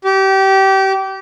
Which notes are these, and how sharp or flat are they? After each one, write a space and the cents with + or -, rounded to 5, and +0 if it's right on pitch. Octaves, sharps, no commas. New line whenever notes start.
G4 -25